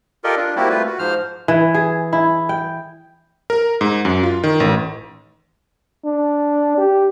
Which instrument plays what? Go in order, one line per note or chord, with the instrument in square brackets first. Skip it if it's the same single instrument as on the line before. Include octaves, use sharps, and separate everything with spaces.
[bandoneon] F4 G4 A4 A#4 D5 D#5
D4 F4
G3 A#3 C4 E4 F#4 G4
A3 F4 B4
F#4
G#2 F3 C5 F6
[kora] E3
G#4
E4
G5
[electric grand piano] A#4
G#2
F#2
F4
D#3
A1
[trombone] D4
G4